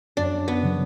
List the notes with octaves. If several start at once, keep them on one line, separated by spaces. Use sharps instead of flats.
F#2 D4
B3
C#3 F#3